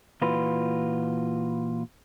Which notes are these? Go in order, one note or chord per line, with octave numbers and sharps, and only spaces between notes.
A#2 E3 F4 F#4 B4